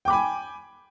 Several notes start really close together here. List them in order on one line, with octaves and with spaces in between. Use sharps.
G5 D6 B5 G#5